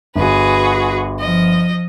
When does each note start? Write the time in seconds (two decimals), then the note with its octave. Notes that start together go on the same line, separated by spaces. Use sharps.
0.15 G1 F#4 G#4 B4
1.20 F3 D#5